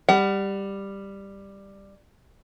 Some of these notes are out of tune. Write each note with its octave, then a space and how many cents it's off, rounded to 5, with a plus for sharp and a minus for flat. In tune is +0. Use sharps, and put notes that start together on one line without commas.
G3 +10 F#5 +30